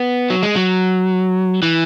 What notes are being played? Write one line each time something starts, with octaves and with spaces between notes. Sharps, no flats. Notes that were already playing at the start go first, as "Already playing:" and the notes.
Already playing: B3
F#3
G#3
F#3
E3